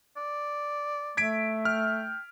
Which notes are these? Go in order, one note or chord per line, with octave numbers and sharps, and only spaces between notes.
D5
A3 G#6 B6 D7
G5 F6